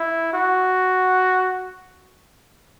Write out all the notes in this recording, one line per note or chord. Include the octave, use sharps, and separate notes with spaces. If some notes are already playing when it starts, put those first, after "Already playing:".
Already playing: E4
F#4